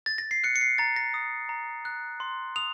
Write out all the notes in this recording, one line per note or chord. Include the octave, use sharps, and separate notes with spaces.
A6
A#6
C7
F#6 C#7
C#7
C7
A#5 A6
A#6
D#6
A#5
F#6
C6
D#6 F7